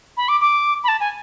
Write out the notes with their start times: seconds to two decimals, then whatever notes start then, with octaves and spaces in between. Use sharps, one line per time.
0.17 B5
0.29 D6
0.41 D6
0.84 B5
0.88 A5
1.00 G#5